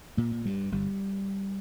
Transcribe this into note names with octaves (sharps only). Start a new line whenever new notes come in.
A#2 A#3
A#2
G2 G3
G1 G3